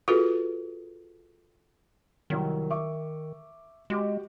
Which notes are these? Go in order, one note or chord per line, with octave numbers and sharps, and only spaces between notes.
F4 F#4 G#4 A4 B4
C2 D#3 F#3
E5 C#6 D6
G#3 F#4 G4 D6